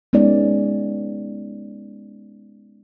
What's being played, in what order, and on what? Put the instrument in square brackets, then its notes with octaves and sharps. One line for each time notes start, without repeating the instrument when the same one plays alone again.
[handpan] G#3 B3 C#4 D#4 D5